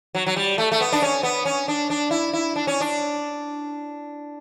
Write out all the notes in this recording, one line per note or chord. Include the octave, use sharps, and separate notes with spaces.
F#3
F#3
G3
A3
A3
B3
D4
C#4
B3
C#4
D4
D4
E4
E4
D4
C#4
D4